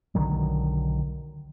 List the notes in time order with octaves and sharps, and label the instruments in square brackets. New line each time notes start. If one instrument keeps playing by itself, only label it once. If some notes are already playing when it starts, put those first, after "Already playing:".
[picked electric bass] B1 D3 D#3 F#3